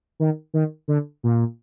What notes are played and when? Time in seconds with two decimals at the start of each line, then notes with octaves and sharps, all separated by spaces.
0.20 D#3
0.54 D#3
0.88 D3
1.23 A#2